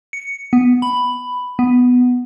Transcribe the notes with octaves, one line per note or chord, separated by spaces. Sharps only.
C#7
B3
B5
B3